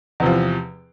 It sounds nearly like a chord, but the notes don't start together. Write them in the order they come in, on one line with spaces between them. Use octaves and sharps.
E2 C3 F3